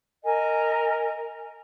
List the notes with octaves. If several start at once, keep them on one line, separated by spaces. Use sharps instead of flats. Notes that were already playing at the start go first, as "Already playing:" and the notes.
A#4 D#5 G#5